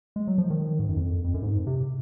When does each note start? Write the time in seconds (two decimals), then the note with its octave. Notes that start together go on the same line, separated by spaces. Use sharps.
0.16 G#3
0.27 F#3
0.38 F3
0.50 D#3
0.79 G#2
0.89 F#2
0.96 F2
1.24 F2
1.34 F#2
1.42 G#2
1.67 C3